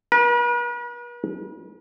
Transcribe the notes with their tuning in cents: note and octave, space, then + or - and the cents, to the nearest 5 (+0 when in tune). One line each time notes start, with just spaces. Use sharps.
B4 -45